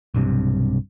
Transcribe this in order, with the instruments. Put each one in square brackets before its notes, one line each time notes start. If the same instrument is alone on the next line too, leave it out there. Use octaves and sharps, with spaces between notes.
[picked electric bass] B1 G2 C3